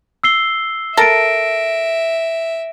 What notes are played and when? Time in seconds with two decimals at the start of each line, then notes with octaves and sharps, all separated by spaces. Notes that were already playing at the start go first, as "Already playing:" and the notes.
0.24 E6 C7 G7
0.97 A4 A#4 E5 A#6 D7